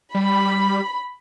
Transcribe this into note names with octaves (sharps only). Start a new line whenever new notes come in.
G3 B5